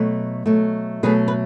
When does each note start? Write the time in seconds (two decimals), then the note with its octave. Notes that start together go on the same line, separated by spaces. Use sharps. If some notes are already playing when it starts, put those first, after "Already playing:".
Already playing: B2 F#3 A3
0.46 B2 F#3 A3
1.03 B2 F#3 A3 G#4 B4
1.28 B4